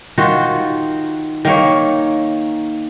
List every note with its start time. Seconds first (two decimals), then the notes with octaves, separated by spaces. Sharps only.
0.18 D#3 F4 F#4
1.45 D#3 A#3 C#5